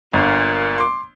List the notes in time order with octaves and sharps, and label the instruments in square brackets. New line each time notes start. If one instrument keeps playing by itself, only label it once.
[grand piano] G1 [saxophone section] A#2
[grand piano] C6 D6